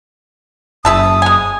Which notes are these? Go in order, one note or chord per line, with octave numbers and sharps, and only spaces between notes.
F#1 G#4 E5 A5 D#6
G#3 G#5